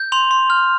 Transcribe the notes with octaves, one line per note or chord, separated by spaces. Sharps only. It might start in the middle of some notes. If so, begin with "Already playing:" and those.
Already playing: G6
C6 F7
C6
F6